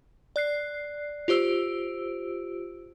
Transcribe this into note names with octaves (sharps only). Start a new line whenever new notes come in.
D5 F#6 C7
F4 G4 C5 E6 D7